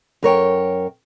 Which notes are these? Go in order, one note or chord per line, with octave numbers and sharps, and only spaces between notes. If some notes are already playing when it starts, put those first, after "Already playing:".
F#2 A#4 C#5 G5